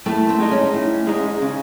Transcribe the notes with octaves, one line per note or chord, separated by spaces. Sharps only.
A2 A3
C4
G#3 D#4
C#4
A2
G#3 D#4
C#3